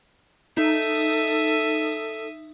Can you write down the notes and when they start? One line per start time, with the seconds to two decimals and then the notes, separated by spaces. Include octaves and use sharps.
0.57 D#4 A4 E5 D#7